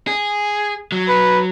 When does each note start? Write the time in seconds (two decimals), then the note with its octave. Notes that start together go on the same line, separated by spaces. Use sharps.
0.07 G#4
0.92 F#3
1.09 B4